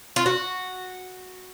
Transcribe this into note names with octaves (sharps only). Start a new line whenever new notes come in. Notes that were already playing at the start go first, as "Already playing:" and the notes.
F4
F#4